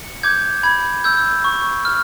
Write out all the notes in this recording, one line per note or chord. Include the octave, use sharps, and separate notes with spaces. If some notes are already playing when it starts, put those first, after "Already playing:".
Already playing: C#7
D6 G6 G#6
B5 G#6
E6 G6
C#6
F6